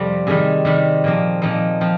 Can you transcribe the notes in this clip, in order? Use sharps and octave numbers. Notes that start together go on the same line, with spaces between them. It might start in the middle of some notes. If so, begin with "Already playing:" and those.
Already playing: F2 C3 G3 C4
C3 D#3 G3 G#4
C3 D#3 G3
A#2 F3 C4
A#2 F3 C4 D#4
F3 C4